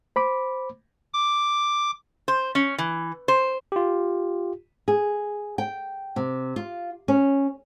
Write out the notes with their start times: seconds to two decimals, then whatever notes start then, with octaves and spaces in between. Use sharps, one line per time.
0.16 C5 B5 D6
1.14 D6
2.28 C5
2.55 C#4
2.78 E3
3.28 C5
3.72 F4 G4
4.88 G#4
5.58 G5
6.16 C3
6.56 F4
7.08 C#4